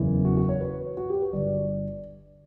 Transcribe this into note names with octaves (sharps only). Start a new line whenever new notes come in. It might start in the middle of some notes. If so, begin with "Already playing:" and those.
Already playing: F#1 E2 C#3
F#4
F#4
C#5
B4
F#4
G4
B4
G1 D3 D5